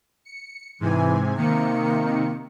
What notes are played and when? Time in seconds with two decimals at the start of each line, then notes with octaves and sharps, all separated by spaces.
0.25 C#7
0.80 G#2 C3 E3 G#5
1.37 C3 D#3 A#3 C#7